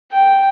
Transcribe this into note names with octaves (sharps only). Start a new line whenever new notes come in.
G5